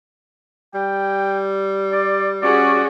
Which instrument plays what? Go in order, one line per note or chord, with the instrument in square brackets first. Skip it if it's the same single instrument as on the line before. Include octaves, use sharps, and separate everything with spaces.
[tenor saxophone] G3 [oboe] G5
[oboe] D5
[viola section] C#4 F#4 G#4 [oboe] D5